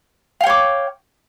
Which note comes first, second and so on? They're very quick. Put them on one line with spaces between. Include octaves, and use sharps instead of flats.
F5 G5 C#5 D6